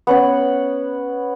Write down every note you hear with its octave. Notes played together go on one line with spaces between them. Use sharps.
B3 C#4 F#5